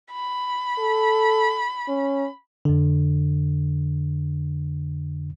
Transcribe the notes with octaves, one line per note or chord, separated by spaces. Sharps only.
B5
A4
C#4
F2 D3